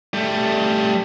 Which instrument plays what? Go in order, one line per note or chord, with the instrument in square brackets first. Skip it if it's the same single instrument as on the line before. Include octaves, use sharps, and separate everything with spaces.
[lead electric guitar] G3 A3